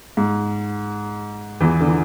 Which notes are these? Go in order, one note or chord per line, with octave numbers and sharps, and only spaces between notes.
G#2
E2 E3
D3
E3